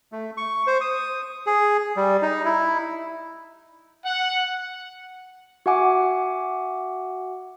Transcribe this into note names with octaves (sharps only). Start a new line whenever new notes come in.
A3
C#6
C5
D#6
G#4
G3
D#4
E4
F#5
F#4 E5 F#5 G#5 D6